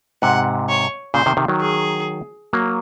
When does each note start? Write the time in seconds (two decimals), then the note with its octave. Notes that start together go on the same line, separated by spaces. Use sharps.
0.22 G#2 C3 F#5
0.69 C#5
1.14 A#2 C#3 C5
1.26 C3 D#3
1.37 C3 D#3
1.48 D#3 F#3
1.61 G#4
2.53 F#3 A#3